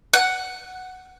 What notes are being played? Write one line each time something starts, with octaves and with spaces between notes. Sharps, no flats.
F#5